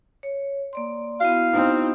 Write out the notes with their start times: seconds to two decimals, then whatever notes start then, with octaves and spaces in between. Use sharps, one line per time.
0.23 C#5
0.73 A#3 D5 C6
1.20 B3 E4 F#4 F5
1.53 C4 D#4